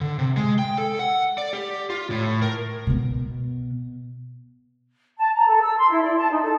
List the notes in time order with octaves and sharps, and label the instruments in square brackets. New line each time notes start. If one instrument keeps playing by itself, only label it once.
[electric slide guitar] D3
C3
G#3
G5
A4
F#5
D5
G4
F4
A2
A#4
[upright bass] B2 B3
[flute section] A5
A#5
A4
E6
C6
E4
D5
A5
D#4
A4